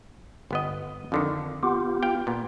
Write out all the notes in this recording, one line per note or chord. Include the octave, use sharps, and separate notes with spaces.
G1 B3 D#5
F2 D3 D#3
B3 F4 G4
F5 G5
A#2 B3